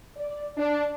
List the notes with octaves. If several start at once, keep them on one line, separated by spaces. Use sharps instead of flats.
D5
D4